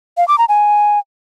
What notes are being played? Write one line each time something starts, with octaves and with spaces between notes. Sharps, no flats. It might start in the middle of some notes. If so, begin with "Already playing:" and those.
F5
D6
A#5
G#5